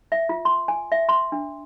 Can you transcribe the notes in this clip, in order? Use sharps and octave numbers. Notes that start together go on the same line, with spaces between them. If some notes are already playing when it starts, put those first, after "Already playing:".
E5
F4
C6
G#5
E5
C6
D4